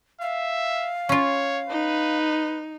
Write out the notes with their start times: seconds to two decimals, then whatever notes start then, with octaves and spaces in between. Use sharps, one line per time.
0.21 E5 F5
1.09 C#4 F4 C#5
1.70 D#4 B4